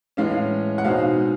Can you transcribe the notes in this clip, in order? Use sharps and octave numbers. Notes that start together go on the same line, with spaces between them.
A2 E3 G#3 C#4 F5
F#5
B2 G#3 C4 D#4 F5